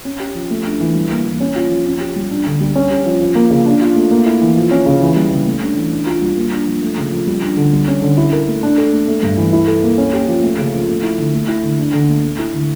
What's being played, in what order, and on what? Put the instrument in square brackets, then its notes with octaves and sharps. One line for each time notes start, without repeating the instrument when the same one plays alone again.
[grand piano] C#4
G4
F3
A3
D4
E3
G3
A#3
E3
C#4
F4
F3
C#4
G4
G3
D4
D3
G3
C#4
G4
F3
F3
A#3
C#3
D4
F4
A3
A#3
E4
E3
F3
C#4
C#3
E3
G3
C#3
A3
D4
E3
D4
F4
G3
A#3
D4
F3
A3
C#3
F3
G3
D4
D3
G3
C#4
D3
E4
A#4
A3
D4
A4
A3
A3
G2
E3
E4
A4
A#3
C#4
G4
F3
A3
C#3
F3
A3
E4
D3
A3
E4
D3
D4
D3
A3
A3
E4
D3